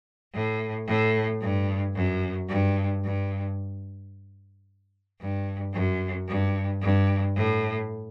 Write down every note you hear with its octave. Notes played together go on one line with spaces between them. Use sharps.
A2
A2
G2
F#2
G2
G2
G2
F#2
G2
G2
A2